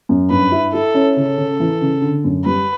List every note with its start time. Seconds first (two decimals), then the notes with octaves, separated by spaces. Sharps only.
0.09 F#2
0.30 G2 B4
0.52 E4
0.73 E4 A4
0.94 C#4
1.16 C#3 A4
1.38 C#3
1.60 E3
1.81 C#3
2.02 D3
2.24 F#2
2.45 G3 B4